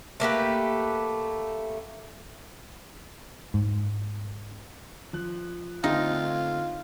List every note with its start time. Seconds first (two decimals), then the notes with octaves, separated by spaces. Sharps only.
0.20 A3 A#3 G4 B4
3.54 G#2
5.13 F3 F#6
5.84 D3 A3 C4 D#4 F4